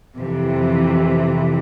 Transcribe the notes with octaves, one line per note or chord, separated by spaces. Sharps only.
F2 C3 E3